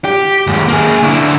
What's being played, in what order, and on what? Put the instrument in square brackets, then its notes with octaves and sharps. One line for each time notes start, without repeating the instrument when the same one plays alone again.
[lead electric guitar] G4
D#2 G#2
A#3 G#4
D3 E4